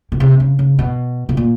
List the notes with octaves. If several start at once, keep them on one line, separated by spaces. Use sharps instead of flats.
B2
C3
C#3
C#3
B2
B2
A#2